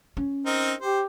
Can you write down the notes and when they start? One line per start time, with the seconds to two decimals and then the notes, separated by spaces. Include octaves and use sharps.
0.17 C#4
0.46 C4 D#4 A#4
0.81 G4 C5